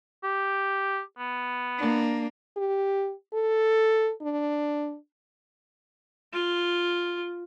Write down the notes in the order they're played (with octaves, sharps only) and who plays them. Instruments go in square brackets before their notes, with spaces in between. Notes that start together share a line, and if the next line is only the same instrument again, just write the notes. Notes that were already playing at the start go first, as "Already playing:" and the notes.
[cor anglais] G4
B3
[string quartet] A#3 D4
[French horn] G4
A4
D4
[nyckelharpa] F4